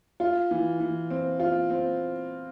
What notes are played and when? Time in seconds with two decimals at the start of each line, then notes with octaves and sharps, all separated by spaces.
0.20 F4
0.51 E3
0.80 E3
1.10 C4
1.40 F4
1.70 C4